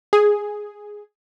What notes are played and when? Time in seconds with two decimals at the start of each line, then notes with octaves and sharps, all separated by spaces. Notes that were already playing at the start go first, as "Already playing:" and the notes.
0.13 G#4